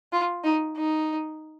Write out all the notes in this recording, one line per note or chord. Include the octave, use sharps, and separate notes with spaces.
F4
D#4
D#4